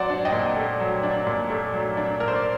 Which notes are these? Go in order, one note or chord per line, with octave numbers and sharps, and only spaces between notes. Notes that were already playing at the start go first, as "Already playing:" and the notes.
Already playing: F#3 C5 D5 F#5
D4
D#5 G5
A#2
A3
F#3
D4
A#2
A3
F#3
D4
A#2 A#4
C5
D5